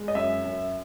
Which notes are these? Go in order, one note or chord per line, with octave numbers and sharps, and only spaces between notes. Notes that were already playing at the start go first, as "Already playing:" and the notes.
Already playing: G#3
D#5
F#2 E5
F#2